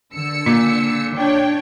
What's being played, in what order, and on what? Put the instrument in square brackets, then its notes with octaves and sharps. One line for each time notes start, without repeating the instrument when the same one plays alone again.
[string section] D3 E6 C#7
[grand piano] A#2
[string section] D4 C#5 G5